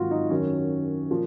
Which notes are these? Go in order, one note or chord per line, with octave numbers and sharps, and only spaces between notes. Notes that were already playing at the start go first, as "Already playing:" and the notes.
Already playing: G#2 D#3 F#3 F4 F#4
D#4
F#2 D#3 F#3 C#4
A#2 F3